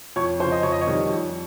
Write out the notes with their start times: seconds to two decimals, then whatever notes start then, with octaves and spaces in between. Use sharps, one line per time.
0.16 F2 C#5
0.39 C#3 F3 C5
0.52 D#5
0.63 F2 C#5
0.72 D#5
0.81 C#5
0.87 D#3 G3
1.09 F2